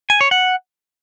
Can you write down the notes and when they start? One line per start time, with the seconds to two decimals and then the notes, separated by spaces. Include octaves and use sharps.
0.10 G#5
0.21 C#5
0.31 F#5